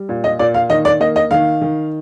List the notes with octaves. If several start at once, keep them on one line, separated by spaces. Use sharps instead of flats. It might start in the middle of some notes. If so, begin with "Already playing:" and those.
Already playing: G3
A#2
D#5
A#2 D5
F5
D#3 D#5
D5
A#3 D#5
D#5
D#3 F5
D#3